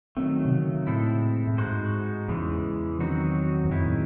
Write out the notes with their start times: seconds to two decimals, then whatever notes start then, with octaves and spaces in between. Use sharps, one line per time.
0.17 D#3 F#3 A3 C4
0.45 C3
0.51 C#3
0.87 A2 G#3 C4 E4 A4
1.47 A2
1.58 G#2 G#3 D#4 F#4 C5
2.28 E2 C#3 E3 G#3
3.00 D#3 F#3 C4 D#4 F#4
3.65 E2
3.70 F#2 D#3 G#3 C4 E4
3.84 A2